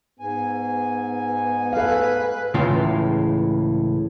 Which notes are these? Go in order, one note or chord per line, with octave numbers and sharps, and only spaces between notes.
G#2 B3 G#5
A4 B4 F5
C#2 A2 C#3 E3 F4 F5